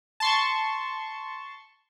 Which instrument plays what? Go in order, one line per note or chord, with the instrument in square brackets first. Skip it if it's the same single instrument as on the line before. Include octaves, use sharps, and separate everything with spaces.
[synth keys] A5 C6 C#6